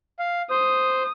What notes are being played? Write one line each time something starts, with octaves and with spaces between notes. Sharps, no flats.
F5
C5 D#6